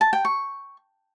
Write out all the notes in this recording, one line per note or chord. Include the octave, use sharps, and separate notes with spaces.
A5
G5
C#6